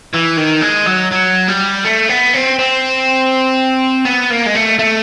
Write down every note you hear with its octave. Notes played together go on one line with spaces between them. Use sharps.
E3
D#3
G#3
F#3
F#3
G3
A3
B3
C4
C4
B3
A#3
G#3
A3
A3